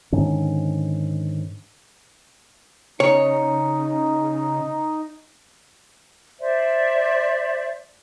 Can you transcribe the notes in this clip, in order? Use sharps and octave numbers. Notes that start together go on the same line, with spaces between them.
G#2 D3 D#3 C#4
C#3 D#4 C#5
C5 D5 E5